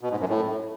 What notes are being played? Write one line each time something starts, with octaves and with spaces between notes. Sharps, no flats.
B2
G#2
F#2
A2